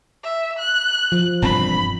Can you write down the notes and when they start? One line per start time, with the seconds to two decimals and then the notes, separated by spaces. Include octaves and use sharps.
0.23 E5
0.58 F#6
1.12 F3
1.42 E1 G2 C4 B5